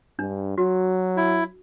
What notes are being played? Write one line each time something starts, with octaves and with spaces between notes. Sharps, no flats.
G2 D4
F#3 F#4
E4